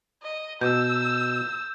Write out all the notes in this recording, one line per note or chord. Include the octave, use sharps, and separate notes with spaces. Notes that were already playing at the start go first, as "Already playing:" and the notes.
D#5
B2 E6 G6